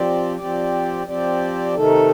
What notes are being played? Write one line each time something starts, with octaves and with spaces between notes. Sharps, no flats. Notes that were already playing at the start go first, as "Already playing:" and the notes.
Already playing: F3 C4 G4 D5
F3 C4 G4 D5
F3 C4 G4 D5
C3 D#3 A3 D#4 A4